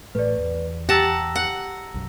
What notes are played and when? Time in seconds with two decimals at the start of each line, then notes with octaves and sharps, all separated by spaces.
0.15 A1 A2 A3 B4 D5
0.38 E2
0.89 G4 F#5 A5 A#5 E6 A#6
1.36 F#5
1.94 B1 F#2